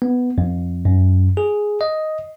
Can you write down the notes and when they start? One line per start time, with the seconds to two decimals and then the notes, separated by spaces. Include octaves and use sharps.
0.02 B3
0.38 F2
0.85 F#2
1.37 G#4
1.81 D#5